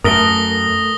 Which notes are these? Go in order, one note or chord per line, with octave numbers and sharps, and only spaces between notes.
F#2 A3 A4 A#4 D#6 A#6 G7